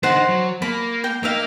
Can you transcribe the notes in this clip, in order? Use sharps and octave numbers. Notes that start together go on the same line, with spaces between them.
D3 D#4 C5 F#5
F#3
A#3 B5
G5
A#3 D#4 E5 F5